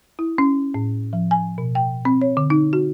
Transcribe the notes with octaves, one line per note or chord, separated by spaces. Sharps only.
E4
C#4
A2
F3
G#5
B2
G5
C4
C#5
D3
D#4
F#4